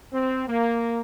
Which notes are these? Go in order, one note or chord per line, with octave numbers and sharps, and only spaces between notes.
C4
A#3